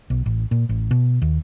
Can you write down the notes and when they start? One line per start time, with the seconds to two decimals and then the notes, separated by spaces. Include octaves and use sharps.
0.10 B1
0.26 A1
0.51 A#2
0.69 A1
0.91 B2
1.22 D#2